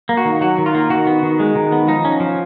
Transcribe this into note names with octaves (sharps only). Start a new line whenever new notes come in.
A#3
F#4
D#3
F#3 F#4
D#3
F4
A#3
D#3 F#4
B3
D#3
G#3
D#3
B3
F3 D#4
C#4
F3